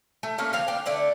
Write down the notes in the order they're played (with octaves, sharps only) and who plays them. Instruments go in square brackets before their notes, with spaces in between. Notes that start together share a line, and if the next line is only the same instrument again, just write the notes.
[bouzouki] A3
A3 A#3 C#4
D3 F3 C4 F5
D4 G5
D3 A3 D5